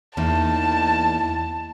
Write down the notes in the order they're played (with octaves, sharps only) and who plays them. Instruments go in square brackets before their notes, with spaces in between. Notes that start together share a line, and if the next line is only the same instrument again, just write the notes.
[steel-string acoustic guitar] E2 A#3 D#4 [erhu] A5